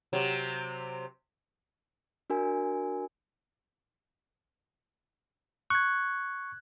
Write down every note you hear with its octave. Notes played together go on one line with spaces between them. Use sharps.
C3 F#3
D4 F#4 A#4 G#5
C#6 F#6 G#6